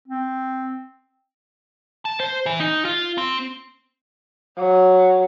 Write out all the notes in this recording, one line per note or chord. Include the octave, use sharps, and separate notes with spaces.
C4
A5
C5
E3
D#4
F4
C4
F#3